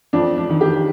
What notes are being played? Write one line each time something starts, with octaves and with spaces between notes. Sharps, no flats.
F2 D4
D4
D#3
G4